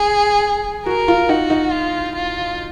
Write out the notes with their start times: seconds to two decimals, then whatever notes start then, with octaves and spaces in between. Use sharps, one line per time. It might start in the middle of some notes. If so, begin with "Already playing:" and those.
Already playing: G#4
0.86 F#4 A#4
1.08 F4
1.29 D#4 F#4
1.50 D#4
1.72 F4
2.15 F4